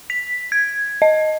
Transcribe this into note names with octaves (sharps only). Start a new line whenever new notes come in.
B6
G#6
D#5